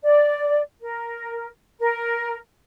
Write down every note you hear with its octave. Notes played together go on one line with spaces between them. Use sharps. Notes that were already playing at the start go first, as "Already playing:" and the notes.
D5
A#4
A#4